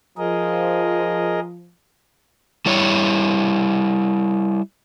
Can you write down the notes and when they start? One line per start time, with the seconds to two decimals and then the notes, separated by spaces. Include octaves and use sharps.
0.18 F3 G#4 A#4 D#5
2.66 G3 E4 C#5